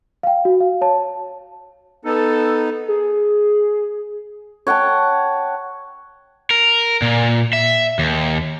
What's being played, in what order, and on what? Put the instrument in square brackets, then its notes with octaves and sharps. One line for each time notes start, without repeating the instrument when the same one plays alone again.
[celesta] F5 G5
F#4
F5
C#5 A5
[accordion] B3 D#4 [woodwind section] A4
[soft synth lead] G#4
[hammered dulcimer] C#5 F#5 G5 A5
[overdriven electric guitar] A#4
A#2
E5
D#2